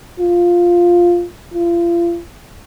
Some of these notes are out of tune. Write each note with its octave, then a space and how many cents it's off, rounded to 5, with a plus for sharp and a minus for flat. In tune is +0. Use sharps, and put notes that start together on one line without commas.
F4 +0
F4 -35